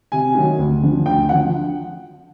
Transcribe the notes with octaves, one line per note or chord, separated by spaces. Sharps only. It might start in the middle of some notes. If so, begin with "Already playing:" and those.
C3 G#5
D#3 F#3
D2
D3 F3
D2 G5
D3 F3 F#5